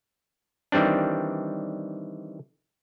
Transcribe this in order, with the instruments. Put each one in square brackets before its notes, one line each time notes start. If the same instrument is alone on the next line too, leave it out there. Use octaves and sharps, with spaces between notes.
[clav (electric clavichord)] D#3 E3 G3 C4 D4